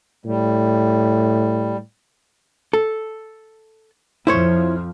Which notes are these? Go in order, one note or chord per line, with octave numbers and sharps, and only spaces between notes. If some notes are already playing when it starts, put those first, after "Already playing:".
A2 G3
A4
F2 F3 E4 C5 C#5